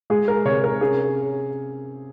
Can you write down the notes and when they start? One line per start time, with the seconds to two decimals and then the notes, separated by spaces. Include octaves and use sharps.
0.10 G#3 G#4
0.28 A#4
0.45 C3 C#5
0.64 A#4
0.81 C#4 G#4